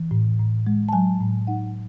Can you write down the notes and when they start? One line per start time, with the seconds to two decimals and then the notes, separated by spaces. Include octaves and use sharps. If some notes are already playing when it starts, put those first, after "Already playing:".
Already playing: E3
0.11 A2
0.39 A2
0.67 G#3
0.89 A5
0.93 F#3 G#5
1.20 A2
1.47 D#4 F#5